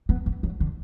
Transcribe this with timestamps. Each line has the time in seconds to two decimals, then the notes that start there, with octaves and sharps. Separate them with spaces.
0.09 B3
0.26 E3
0.43 F#3
0.60 D3